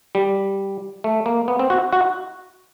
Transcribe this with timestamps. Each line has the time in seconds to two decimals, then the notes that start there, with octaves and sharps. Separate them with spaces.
0.15 G3
1.04 A3
1.26 A#3
1.48 B3
1.59 C4
1.70 F#4
1.93 F#4